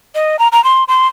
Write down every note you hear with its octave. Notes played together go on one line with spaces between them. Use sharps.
D#5
A#5
A#5
C6
C6